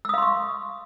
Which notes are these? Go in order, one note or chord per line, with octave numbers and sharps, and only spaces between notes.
F5 C6 C#6 D#6 E6